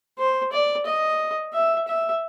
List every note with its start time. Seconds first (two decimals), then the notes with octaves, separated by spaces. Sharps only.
0.18 C5
0.52 D5
0.86 D#5
1.54 E5
1.87 E5